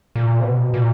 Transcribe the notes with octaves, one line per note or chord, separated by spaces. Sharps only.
A#2
C3
B2
A#2